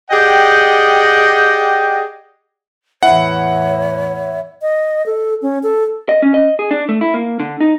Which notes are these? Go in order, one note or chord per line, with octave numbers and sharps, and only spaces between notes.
G4 G#4 D5 D#5 F#5 G5
E2 A2 E4 C#5 F#5
D#5
A4
C#4
A4
D#5
C#4
D#5
G#4
D4
A3
E4
A#3
D3
D#4